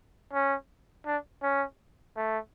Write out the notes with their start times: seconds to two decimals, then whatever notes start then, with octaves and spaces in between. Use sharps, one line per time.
0.33 C#4
1.06 D4
1.42 C#4
2.17 A3